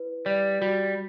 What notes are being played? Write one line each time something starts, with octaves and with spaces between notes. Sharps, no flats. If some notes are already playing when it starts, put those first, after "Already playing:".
Already playing: E4 B4
G3 D5
G3 F#4